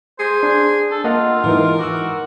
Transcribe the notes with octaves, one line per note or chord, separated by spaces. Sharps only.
G#4 C5
D4
A4
A#3 F4 D#5 F#5
G#2 E3 D#4 A#4
F#4 D6 E6